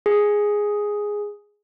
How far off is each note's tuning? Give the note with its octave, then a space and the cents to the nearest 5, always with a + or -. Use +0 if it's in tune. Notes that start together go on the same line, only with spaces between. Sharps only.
G#4 -5